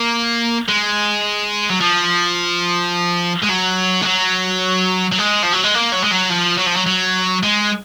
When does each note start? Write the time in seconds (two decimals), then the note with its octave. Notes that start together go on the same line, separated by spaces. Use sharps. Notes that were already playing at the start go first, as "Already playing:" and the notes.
Already playing: A#3
0.69 G#3
1.70 F#3
1.80 F3
3.43 G#3
3.50 F#3
4.02 G#3
4.05 F#3
5.12 F#3
5.18 G#3
5.43 F3
5.53 F#3
5.64 G#3
5.74 A#3
5.92 F#3
6.04 G#3
6.11 F#3
6.30 F3
6.58 F#3
6.66 F3
6.76 F#3
6.87 F#3
7.43 G#3